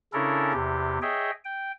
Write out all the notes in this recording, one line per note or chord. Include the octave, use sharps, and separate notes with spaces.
C#3 C#4 D4 E4 A4 A#4
E2 C3 G4
G#4 C#5 D#5 E5 G5
G5